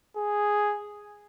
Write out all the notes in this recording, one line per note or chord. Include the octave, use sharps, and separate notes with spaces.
G#4